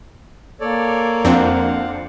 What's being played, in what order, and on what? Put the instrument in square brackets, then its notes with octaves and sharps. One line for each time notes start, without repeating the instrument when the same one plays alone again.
[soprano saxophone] A#3 [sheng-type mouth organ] A4 C#5 D5
[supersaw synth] F2 C4 D4 [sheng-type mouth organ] F5 F#5